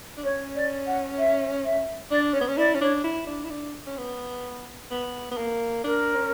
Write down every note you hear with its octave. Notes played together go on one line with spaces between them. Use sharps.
D4
C#4 C#5
D5
F#5
E5
E5
D4 D5
C#4 C#5
B3
C#4
E4 D5
C#4
D4 C#5
E4
D4
E4
D4
C#4
B3
B3
B3
A#3
D4 A#4
C#4